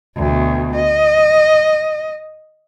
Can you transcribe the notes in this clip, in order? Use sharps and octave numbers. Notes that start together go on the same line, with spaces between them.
D2 B2
D#5